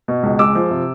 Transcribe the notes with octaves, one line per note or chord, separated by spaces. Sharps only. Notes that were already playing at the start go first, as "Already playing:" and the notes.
B2
C#2
G#3 D6 E6
F3
C3